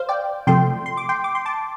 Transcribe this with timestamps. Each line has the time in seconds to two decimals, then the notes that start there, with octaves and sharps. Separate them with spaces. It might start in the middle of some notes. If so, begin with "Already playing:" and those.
Already playing: C5 F5
0.09 D5 G5
0.47 C3 F3 A3 G5 C6
0.86 C6
0.97 D6
1.09 G5 C6
1.24 D6
1.35 C6
1.45 A5 D6